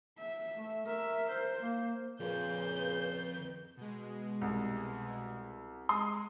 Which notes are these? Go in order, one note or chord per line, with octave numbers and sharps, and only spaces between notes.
E5
A3
A#4 E5
C5
A#3
F2 A#2 C#3 B4 G6
B2 G#3
C2
G#3 C6 D#6